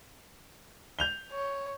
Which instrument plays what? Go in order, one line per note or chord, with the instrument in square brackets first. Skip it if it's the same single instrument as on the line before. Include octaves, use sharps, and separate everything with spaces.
[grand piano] G6 F7 G7
[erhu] C#5